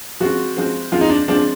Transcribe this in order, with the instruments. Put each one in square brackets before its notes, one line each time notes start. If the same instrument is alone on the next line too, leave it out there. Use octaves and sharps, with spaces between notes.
[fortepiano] F3 G#3 C4 [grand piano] F#4
[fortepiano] F3 G#3 C4
[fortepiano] F3 G#3 C4 [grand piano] F4
[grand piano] D#4
D4
[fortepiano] F3 G#3 C4 [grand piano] D4